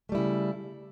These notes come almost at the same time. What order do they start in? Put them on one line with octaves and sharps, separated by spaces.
A3 G3 E4 C#3